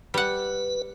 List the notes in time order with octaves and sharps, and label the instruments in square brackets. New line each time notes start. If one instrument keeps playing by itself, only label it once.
[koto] G3 F#5 [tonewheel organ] B4